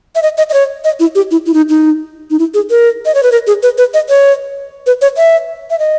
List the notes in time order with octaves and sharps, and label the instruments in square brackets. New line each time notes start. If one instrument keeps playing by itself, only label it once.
[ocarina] E5
D#5
D#5
D#5
C#5
D#5
E4
G4
E4
E4
D#4
D#4
D#4
E4
G#4
A#4
D#5
C#5
B4
A#4
G#4
B4
B4
D#5
C#5
B4
C#5
E5
E5
D#5